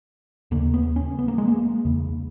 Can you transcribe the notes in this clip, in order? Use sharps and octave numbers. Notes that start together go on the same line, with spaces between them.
D#2 C#3 A#3
B3
C#4
B3
A#3
G#3
A#3
E2 C#3